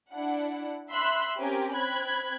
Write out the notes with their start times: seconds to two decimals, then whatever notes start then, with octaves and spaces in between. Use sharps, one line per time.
0.12 D4 E4 F#5
0.90 E5 B5 C6 E6 F#6
1.38 C4 C#4 G4 A#4 G#5
1.73 C4 B5 F#6 G#6